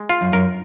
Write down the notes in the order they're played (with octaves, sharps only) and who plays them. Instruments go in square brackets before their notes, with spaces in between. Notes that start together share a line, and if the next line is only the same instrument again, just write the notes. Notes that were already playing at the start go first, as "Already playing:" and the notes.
Already playing: [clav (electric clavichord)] G#3
F4
[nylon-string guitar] F#2
[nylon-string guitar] F#2 [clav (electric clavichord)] A#4